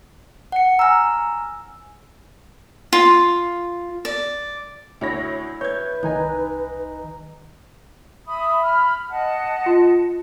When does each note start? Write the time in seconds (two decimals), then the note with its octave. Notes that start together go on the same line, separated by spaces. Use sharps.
0.52 F#5 C#7
0.79 G#5 A#5 E6 F6
2.93 F4
4.05 D5
5.01 D2 E4 C#5 A#6
5.61 B4 C#5 G6 G#6
6.03 C2 D#3 D#4 G#5
8.27 E5 B5 D#6
8.62 B5 F6
9.10 D#5 F#5 A5
9.66 F4